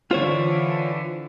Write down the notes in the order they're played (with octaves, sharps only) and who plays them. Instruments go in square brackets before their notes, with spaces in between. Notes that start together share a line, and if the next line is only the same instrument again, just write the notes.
[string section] D3 E3 [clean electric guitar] F4 C5 C#5